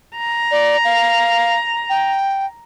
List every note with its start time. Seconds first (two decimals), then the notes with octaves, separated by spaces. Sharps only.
0.17 A#5
0.51 D5
0.85 F5
1.90 G5